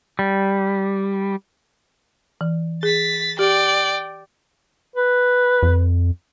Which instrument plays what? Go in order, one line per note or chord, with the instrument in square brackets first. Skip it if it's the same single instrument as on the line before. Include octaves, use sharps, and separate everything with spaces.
[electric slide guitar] G3
[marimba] E3
[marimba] G#4 [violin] A6 B6
[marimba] G4 [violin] D5 G5
[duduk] B4
[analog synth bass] F2